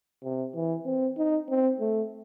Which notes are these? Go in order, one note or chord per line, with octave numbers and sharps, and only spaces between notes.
C3
E3
C4
D#4
C4
A3